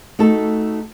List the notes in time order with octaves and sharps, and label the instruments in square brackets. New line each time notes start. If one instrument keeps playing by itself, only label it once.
[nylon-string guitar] A3 D#4 F#4 A4